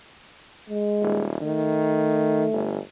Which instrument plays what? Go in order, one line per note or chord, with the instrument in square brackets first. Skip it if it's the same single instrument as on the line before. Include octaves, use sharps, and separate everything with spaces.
[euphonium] G#3
[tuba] D#1
[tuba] D#3 [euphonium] A3
[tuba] G1